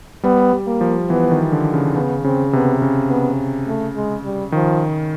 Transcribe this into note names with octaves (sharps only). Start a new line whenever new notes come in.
G3 B3
G3
A#3
F3
E3 B3
D#3
D3
C#3
C#3 B3
C#3 C4
C3 B3
C#3
B3
A3
G#3
G3
D#3 F3